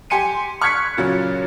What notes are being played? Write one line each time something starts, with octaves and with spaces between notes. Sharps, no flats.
G4 G#5 C6 C#7 D#7
C#6 F6 F#6 G#6 B6 C#7
A#2 C#3 F#3